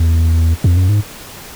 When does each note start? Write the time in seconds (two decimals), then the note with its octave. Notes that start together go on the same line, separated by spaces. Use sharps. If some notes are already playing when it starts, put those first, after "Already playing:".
Already playing: E2
0.64 F2
0.77 F#2
0.89 G#2